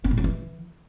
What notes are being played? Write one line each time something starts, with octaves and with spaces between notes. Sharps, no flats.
B3
A#2
F#3
E3